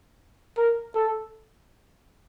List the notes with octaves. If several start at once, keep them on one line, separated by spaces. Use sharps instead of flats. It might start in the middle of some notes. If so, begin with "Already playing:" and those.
A#4
A4